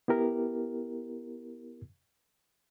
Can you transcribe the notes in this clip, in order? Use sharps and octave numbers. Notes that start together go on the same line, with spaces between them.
B3 E4 G4 A#4